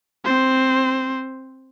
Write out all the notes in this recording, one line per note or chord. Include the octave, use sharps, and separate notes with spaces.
C4 C5